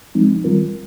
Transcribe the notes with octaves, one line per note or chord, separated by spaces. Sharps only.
F3 G#3 C4 D#4
D#3 G3 C4 F4 A#4